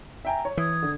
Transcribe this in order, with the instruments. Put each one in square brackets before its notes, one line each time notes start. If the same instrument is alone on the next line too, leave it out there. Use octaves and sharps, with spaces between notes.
[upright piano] E5 G5 G#5 [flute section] A#5
[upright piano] C#5
[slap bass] E3 [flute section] D#6 G#6
[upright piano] D3